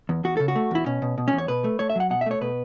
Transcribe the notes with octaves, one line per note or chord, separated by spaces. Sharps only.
E2
E2 F#4
C#3 A4
F#4
A3
E2 E4
B2 C#4
B2
B2
C#4
E2
C#5
B2 B4
A3
A3 C#5
E5
F#3 F#5
B2 F#5
E5
A3 C#5
B2 B4